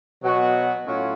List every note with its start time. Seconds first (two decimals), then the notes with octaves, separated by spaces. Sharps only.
0.22 B2 F#3 B3 F#4
0.85 A2 F#3 C#4 F4